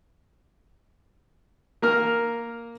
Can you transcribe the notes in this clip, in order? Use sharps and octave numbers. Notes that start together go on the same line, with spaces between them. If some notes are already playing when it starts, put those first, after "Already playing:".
A#3 A#4 F6